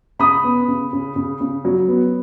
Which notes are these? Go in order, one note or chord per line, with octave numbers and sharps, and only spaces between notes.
C#3 B5 D#6
B3
C#3
C#3
C#3
C#3
F#3
B3